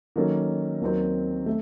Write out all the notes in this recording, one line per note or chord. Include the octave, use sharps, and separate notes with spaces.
D#3 F#3 A#3 C#4 A4
D#2 D#3 F#3 C4
A3